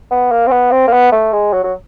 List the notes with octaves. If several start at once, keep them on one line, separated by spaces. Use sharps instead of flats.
B3
A#3
C4
B3
C4
A#3
B3
A3
G#3
F#3
F#3